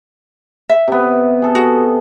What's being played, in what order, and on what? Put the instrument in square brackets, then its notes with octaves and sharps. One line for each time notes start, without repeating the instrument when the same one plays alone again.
[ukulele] E5
[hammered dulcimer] C3 B3
G#4 A4
[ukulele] F#4